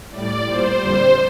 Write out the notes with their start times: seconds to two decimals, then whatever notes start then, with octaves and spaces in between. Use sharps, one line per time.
0.11 A2 G3 D5
0.46 A#2 G3 C5
0.81 F2 D3 G3 C5